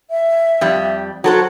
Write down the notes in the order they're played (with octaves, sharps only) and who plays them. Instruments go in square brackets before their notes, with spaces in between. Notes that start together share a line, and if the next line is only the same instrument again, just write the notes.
[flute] E5
[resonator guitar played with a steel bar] F2 G3
[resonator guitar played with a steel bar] F#3 A4 C5 [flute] F#4